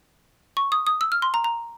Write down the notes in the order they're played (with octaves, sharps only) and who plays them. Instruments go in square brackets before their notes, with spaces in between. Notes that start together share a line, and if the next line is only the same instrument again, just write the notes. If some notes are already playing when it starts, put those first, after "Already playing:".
[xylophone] C#6
D#6
D#6
E6
F6
C6
A#5
A#5